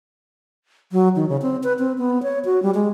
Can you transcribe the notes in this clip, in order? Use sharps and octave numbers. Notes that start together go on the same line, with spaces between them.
F#3
D#3
C#3
C4
B4
C4
B3
C#5
F#4
G3
G#3